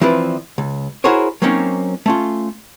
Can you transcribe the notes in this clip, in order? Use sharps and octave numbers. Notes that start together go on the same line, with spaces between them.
E3 F3 C4 E4 B4 D5
C#2
E4 F#4 G#4 A#4 C5 C#5
F#3 A#3 C4 C#4 D#4
A3 C#4 F4